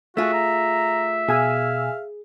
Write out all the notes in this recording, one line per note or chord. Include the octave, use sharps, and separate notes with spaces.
A3 F4 F#4 G#4 E5
A#5
B2 G#4 F5 G#5 E6